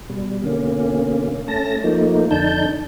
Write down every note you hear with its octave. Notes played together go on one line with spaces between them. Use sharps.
B2 G3
B2 D3 A#3 C#4
A3 C#4 A5 A#6
F3 A3 A#3 D#4
F2 D3 D4 D#4 A5 G6